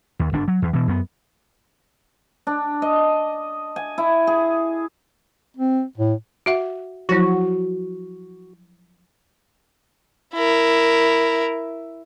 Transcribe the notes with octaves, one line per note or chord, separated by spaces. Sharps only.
D#2
G1 D4
F#3
E2
B2 E3
F#2 B3
D4
D#5
G#5
E4
G#4
C4
A2
F#4 E5 F#5
F3 F#3 E4 F#4
E4 A#4